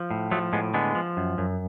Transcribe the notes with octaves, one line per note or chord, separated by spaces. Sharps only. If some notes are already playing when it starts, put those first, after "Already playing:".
Already playing: F3
A2
F3 F#3 A3
A2 G#3 B3
D3 G#3 B3
F3
F#2
F#2